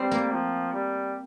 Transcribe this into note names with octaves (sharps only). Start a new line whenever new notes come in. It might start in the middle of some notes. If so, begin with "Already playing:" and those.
Already playing: G3 C4
A#3
F3
G3